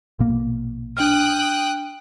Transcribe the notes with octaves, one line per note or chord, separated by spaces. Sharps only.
A#1 B2 A#3
D4 G5 D#6 F6 F#6